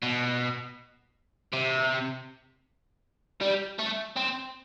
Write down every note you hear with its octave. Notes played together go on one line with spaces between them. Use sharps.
B2
C3
G3
A3
C4